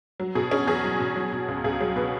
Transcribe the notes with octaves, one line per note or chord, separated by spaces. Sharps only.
F#3
B2 G#4
C#4 G#4
E2 G#4
F#3
B2
F#3
B2
C#2
C#2 G#4
F#3 G#4
B2 B4